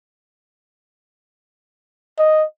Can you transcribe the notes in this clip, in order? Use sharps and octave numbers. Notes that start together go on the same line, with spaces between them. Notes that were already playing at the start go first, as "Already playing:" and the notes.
D#5